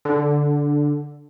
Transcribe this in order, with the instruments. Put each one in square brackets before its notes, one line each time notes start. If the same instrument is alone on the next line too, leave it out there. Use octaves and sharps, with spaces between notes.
[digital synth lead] D3